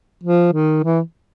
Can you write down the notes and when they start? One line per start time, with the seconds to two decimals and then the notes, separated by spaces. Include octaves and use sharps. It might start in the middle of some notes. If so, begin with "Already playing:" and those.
0.24 F3
0.53 D#3
0.83 E3